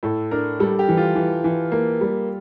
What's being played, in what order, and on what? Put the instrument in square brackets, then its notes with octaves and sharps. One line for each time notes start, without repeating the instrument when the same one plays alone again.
[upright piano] A2 [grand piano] A4
[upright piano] D4 [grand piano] A#4
[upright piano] G3 [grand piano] A4
[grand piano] G4
[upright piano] E3
[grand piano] F4
[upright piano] E3
E3
A#3
G3